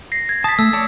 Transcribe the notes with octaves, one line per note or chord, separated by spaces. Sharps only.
A#6 C7
G#6 A#6
A5 D#6 B6
A3 E6
C#5 D5 A5